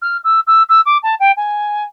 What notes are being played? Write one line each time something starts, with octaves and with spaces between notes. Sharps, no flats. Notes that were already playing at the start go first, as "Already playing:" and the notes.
F6
E6
E6
E6
D6
A5
G5
G#5